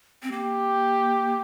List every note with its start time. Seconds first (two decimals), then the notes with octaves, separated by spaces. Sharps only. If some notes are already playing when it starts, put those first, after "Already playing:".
0.23 C4
0.32 A#3 G4